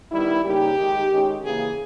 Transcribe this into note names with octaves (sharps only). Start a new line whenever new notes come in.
D#3 G3 B3 E4
C#3 G3 A#3 D#4 G4
D#3 G#3 D#4
D#3 G#3 C#4
C#3 E3 A#3 G#4